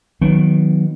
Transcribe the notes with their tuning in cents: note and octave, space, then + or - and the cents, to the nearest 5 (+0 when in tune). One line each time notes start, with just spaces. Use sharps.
D#3 +0 F#3 -25 B3 +0